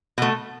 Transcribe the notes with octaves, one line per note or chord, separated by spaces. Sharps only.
B2 A3